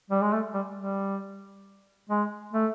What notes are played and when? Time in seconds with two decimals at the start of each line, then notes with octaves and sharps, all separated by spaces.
0.11 G3
0.22 G#3
0.33 A3
0.54 G3
0.77 G3
2.10 G#3
2.54 A3